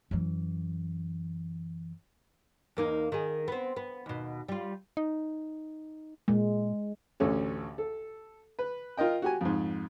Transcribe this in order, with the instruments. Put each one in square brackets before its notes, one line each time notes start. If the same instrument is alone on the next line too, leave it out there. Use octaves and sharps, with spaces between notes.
[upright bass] F#2 E3
[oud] E2 A#3 D#4
D#3 G#4
B3 C4
B3
D#2 B2
G3 F4
[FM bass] D#4
[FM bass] A#2 [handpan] G#3
[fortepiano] A1 D2 C#4 A4
A4
B4
F4 A#4 D#5 G5
F#4 G4 G#5
F2 G#2